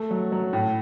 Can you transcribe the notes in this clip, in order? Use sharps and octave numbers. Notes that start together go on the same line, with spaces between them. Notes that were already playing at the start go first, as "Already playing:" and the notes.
Already playing: A3
F#3
F#3
A2